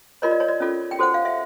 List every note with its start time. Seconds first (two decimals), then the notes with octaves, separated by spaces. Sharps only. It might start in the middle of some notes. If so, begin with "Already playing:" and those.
0.22 F4 A#4 C#5 D#5
0.31 D5
0.40 C#5
0.48 D5
0.60 C#4 F4 A4
0.91 G5
0.99 F#4 A4 C5 F#5
1.14 F5
1.25 E5